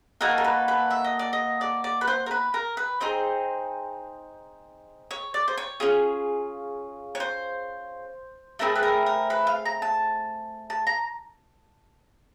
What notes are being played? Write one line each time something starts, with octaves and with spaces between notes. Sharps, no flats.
A#3 D#4 F#4 A4 A#4
A#4
B4
B4
E5
D#5
D5
D#5
D5
D5
B4
C5
A#4
B4
A#4
B4
C4 D#4 G#4 C5
C#5
D5
C5
C#5
C#4 F4 G#4
C#5
C5
A3 C4 E4 G#4 A#4
B4
A#4
A#4
B4
F5
A#5
A5
A5
A#5